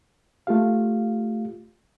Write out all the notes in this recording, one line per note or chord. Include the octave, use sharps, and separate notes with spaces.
A3 F4 G4 F5